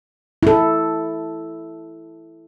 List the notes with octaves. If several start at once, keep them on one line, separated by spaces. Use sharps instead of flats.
E4 A4